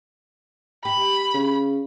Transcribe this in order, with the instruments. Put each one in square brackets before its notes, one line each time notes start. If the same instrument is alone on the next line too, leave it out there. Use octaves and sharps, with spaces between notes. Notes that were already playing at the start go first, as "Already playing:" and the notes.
[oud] G4 [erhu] B5
[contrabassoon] C#3